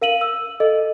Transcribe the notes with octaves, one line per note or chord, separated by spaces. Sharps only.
A#4 F5 D#7 F#7
E6
A4 D#5